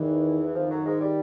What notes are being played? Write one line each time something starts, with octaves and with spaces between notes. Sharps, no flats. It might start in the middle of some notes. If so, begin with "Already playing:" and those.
Already playing: E2 D#3 E3
E3
F2 D#3 F3
F#2 F#3
G#2 G#3
G3